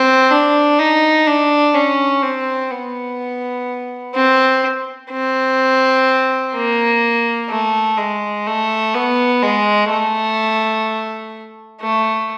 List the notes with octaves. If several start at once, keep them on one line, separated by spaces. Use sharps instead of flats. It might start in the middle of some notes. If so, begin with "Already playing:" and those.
Already playing: C4
D4
D#4
D4
C#4
C4
B3
C4
C4
A#3
A3
G#3
A3
B3
G#3
A3
A3